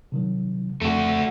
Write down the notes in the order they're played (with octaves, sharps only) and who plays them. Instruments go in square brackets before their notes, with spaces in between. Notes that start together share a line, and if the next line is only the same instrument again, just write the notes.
[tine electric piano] C3 D#3 F#3
[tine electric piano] F2 [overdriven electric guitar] A3 F#4